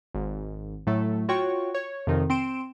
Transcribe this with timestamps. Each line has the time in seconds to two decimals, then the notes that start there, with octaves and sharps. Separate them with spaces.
0.14 G#1
0.87 A2 F#3 A3
1.28 F4 F#4 C#5 G5 C#6
1.74 C#5
2.07 F2 C3 D#3
2.30 C4 C6 D7 E7